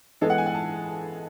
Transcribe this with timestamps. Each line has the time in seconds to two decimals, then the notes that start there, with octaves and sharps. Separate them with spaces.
0.21 E3 G#3 B3 A4
0.30 F#5
0.38 G#5
0.46 F#5
0.54 A5